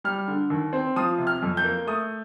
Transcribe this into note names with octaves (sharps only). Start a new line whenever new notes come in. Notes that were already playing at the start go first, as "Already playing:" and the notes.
G3 F6
D3
D#2
C4
F3 D#6
C3
F6
F2
G6
A#3
A3 D#6